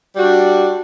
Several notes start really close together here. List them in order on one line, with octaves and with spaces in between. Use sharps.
G3 F#4 D4